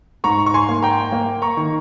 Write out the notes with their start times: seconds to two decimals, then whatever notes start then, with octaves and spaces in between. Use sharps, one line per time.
0.24 G#2 A#5 C#6
0.46 C#6
0.54 G#5 C6
0.69 A#3
0.82 G5 A#5
1.12 A#3
1.42 A#5 C#6
1.57 D#3